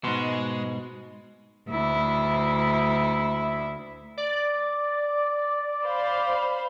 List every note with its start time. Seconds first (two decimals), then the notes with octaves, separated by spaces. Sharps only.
0.04 G#2 B2 G#3 C6
1.68 D2 E4
4.17 D5
5.86 C5 F5 B5